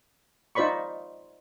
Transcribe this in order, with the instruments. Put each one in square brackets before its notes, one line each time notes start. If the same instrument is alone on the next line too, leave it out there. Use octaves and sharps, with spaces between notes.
[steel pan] D#4 F4 C5 D5 B5 C#6